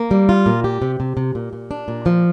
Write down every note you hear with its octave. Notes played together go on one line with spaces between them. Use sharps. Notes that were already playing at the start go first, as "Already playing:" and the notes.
Already playing: A#3
G3
F4
A#2
G4
C3
C3
C3
A#2
A#2
D4
A#2
F3